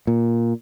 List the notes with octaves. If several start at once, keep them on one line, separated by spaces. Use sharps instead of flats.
A#2